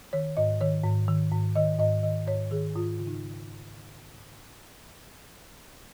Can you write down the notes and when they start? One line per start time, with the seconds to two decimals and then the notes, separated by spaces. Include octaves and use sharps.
0.13 D#3 C#5
0.37 G#2 D#5
0.61 D#3 C#5
0.84 G#2
1.08 D#3
1.32 G#2
1.55 D#3 D#5
1.79 G#2 D#5
2.03 D#3 D#5
2.27 G#2 C#5
2.51 D#3 G#4
2.75 G#2 F4
2.98 C#3 F4
3.07 D#4